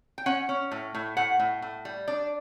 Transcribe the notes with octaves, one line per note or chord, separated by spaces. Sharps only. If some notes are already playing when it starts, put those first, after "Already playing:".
G5
C#4 F#5
C#4
A2
A2
A2 F#5
A2
A2
G3
D4 D5